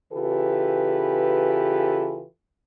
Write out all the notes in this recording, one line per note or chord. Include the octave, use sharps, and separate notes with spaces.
C#3 E3 F4 G4 A4 B4